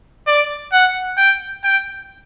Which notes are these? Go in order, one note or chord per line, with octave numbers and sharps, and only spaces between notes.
D5
F#5
G5
G5